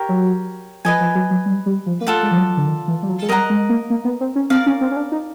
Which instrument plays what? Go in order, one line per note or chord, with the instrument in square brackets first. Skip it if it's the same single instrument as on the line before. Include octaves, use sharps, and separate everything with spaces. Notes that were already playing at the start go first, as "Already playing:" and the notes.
Already playing: [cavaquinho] G4 A#4 C#5
[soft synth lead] F#3
[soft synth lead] F3 [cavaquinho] B4 D#5 G#5
[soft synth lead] F3
F#3
F#3
G3
G3
F3
A#3
[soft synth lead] A3 [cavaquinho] F4 A4 D5 F#5
[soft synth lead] G#3
F3
F#3
D3
D#3
E3
G3
F#3
G#3
[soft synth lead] G3 [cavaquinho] A#4 D#5 F#5 A#5
[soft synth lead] G#3
A#3
A#3
B3
C4
C#4
[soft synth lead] C4 [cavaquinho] A#4 D5 F5
[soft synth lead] C#4
C4
C#4
D4
D#4